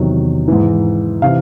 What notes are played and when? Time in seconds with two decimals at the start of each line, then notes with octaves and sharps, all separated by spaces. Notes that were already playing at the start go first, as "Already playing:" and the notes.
Already playing: E2 C3 D#3 F#3
0.48 G#2 E3
1.22 C3 E3 F5